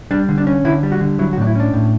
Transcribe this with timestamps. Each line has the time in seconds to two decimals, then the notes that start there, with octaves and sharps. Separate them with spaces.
0.11 G3 D4
0.29 D3
0.38 D4
0.47 C#4
0.65 D3 E4
0.83 G3
0.92 F#4
1.01 D3
1.19 F#3 E4
1.33 F#4
1.38 A2 D4
1.47 E4
1.55 C#4 D4
1.73 A2